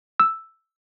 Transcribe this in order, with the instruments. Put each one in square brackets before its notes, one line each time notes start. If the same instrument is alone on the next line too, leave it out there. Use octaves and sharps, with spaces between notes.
[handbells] E6